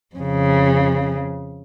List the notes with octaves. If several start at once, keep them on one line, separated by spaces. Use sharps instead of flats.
F2 C#3